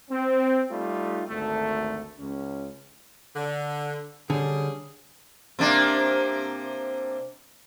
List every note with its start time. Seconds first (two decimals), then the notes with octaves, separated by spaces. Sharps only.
0.11 C4
0.71 G3 A3 D#4 F4
1.28 G#1 D2 A3
2.19 C#2 C#4
3.35 D3
4.30 D3 G3 C#4 G#4
5.59 C3 A#3 D4